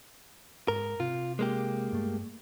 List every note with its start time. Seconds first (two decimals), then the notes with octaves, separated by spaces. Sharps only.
0.68 G#2 A#4
1.00 C3 F4
1.39 G#3 A#3 G4
1.92 G2 A3